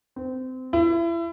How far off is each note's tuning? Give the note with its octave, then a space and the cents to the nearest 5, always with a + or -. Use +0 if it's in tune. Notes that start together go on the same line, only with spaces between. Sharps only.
C4 -25
E4 +30